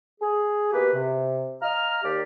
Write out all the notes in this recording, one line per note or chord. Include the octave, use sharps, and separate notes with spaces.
G#4
B2 A#3 G4 B4
C3
D#5 F5 A#5 F6
D#2 G4 D5